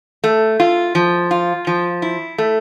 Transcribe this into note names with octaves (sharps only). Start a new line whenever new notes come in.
A3
F4
F3
F4
F3
E4
A3